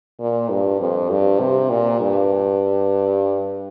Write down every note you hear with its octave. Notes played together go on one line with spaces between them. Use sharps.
A#2
G2
F2
G2
C3
A#2
G2